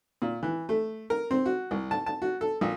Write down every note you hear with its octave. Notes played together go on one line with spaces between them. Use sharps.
A#2
E3
A3
A#4
C4
F#4
C2
A5
A5
F#4
A4
A#1